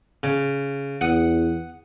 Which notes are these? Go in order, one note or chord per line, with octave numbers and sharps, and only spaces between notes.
C#3
E2 F#5 D#6